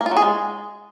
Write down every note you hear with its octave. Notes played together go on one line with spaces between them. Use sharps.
A#3
F4
F#3
G#4
G#3